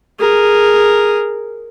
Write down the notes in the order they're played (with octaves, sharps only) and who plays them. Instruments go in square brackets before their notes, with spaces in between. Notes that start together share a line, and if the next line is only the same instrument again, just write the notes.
[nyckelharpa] G#4 A#4